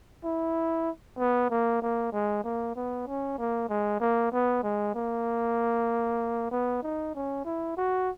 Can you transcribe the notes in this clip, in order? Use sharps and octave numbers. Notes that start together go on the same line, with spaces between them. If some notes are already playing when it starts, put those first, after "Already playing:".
E4
B3
A#3
A#3
G#3
A#3
B3
C#4
A#3
G#3
A#3
B3
G#3
A#3
B3
D#4
C#4
E4
F#4